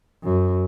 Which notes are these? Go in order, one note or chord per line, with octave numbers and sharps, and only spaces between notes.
F#2